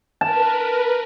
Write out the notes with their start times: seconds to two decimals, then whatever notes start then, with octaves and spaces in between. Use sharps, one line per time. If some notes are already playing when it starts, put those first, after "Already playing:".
0.21 A#4 B4 A5